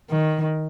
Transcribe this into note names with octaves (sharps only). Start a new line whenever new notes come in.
D#3